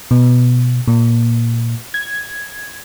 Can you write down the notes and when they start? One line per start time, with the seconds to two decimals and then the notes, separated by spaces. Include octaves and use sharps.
0.11 B2
0.88 A#2
1.94 G#6